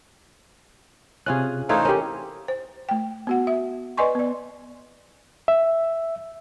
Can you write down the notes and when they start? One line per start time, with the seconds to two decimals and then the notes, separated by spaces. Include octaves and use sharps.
1.26 C3 C#4 F4 G#4 F#6
1.69 E3 A3 D#4 C5 C#5 F5
1.85 C#4 G4 A#4
2.48 C5
2.89 A3 G5
3.27 B3 F#4 F#5
3.47 E5
3.97 B4 D5 D#5 G#5 C6 C#6
4.15 B3 D5
5.48 E5